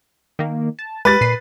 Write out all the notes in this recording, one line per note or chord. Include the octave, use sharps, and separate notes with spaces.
D#3 A#3
A5
G#3 G4 A#4 B4 A6
A#2 C7 D#7